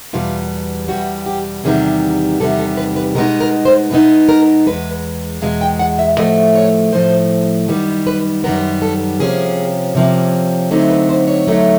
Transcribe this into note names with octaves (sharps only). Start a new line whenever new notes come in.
E2 B2 G3 F4
E2 B2 G3 F#4
G4
E2 C3 D#3 G3 B3 G#4
E2 C3 D#3 G3 B3 A4
A4
B4
B4
B2 G#3 B3 D#4 A#4
A#4
C5
B2 G#3 B3 D#4 B4
A#4
E2 B2 G#3 B4
E2 B2 G#3 F5
G5
F#5
E5
A2 F3 A3 D#5
C#5
A2 F3 A3 C5
F#2 D#3 G3 B3 B4
B4
F#2 D#3 G3 B3 A#4
A4
C3 F3 A#3 C#4 G#4
C3 F3 A#3 C#4
D3 F#3 A3 C4 D#4
B4
C5
C#5
D3 F#3 A3 C4 D#4